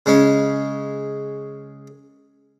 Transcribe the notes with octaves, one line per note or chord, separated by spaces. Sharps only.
C#3 G#3 C#4